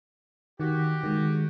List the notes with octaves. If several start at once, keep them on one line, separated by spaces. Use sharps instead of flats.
D#3 F#4 G4
D#3 G#3